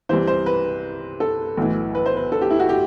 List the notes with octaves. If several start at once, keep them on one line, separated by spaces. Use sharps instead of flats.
C2 C3 E3 C5
C5
B4
A4
B1 A2 E3
B4
C5
B4
A4
G4
E4
F#4
G4